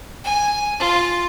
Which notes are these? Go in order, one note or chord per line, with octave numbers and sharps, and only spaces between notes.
G#5
F4